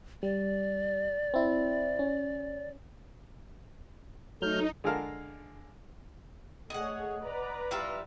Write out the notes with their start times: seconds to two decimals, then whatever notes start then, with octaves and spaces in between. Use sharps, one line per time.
0.23 G3 D5
1.34 C4 E4
1.99 C#4
4.42 F#3 A3 D#4 F6 G6
4.84 D3 G#3 G#4 A#4 F5 A5
6.70 A3 G#4 C#5 D#5 F#5
7.23 B4 D5 A#5
7.71 G3 E4 F4